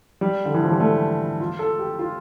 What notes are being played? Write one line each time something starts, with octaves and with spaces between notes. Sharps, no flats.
G3
D3
E3
F3
G3
A3
F4
A4
G4
F4